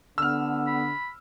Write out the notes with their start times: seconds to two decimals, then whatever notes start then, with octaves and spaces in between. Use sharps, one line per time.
0.18 D3 B3 E6 F6
0.67 B5